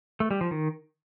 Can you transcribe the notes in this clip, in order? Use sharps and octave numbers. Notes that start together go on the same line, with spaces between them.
A3
G3
F3
D#3